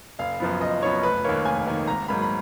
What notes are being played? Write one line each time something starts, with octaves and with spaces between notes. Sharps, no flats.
F#1 F5
F#2 F3 B3
F#1 D#5
F#2 F3 B3 C#5
F1 B4
D#2 D#3 A#3 C#5
F1 G#5
D#2 D#3 A#3
G#1 A#5
G#2 F#3 A#3 B5
B5